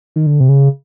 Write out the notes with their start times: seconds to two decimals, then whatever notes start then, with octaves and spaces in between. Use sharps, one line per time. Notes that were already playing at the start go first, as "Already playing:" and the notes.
0.16 D#3
0.26 D3
0.40 C3
0.49 C#3